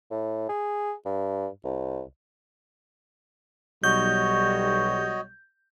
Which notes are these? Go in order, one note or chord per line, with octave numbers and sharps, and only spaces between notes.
A2
G#4
G2
C2
B1 G3 F#4 C#5 D#5 G6